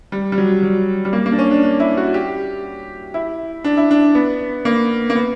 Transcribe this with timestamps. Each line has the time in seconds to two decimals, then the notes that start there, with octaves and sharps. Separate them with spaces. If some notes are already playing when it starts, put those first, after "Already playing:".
0.12 G3
0.32 G3
0.38 F#3
0.63 F#3
1.05 G3
1.13 A#3
1.26 A#3
1.32 D4
1.39 C#4
1.51 D4
1.63 D4
1.80 E4
1.97 F#4
2.14 G4
3.14 E4
3.64 D4
3.77 E4
3.91 D4
4.15 B3
4.65 A#3
5.10 A#3
5.16 B3